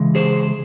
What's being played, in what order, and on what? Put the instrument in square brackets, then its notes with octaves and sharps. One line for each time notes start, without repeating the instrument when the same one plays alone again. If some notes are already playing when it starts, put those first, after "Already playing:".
Already playing: [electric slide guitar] C#3 E3 G#3
G#4 C5